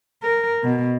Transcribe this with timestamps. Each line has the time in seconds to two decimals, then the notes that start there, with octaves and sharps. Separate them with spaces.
0.23 A#4
0.64 B2